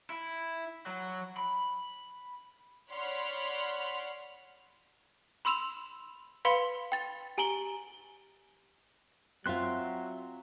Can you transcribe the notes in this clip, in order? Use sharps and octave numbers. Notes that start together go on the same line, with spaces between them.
E4
F#3
B5
C#5 D5 F#5 B5 C6 F6
B5 C6 E6 E7 F7
B4 F5 B5 C6 C#7 G7
G5 A6
G4 G#5 A#5 D7 F#7 G7
F#3 C4 F4 E5 C6 F#6